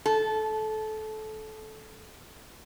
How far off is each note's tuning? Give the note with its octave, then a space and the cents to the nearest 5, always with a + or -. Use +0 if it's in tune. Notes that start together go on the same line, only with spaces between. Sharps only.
A4 -20